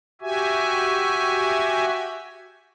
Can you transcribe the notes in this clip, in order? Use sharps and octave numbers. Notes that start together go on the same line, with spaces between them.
F#4 G4 E5 G#5